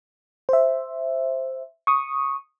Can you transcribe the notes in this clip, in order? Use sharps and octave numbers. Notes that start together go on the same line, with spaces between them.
C5 E5
C#6 D#6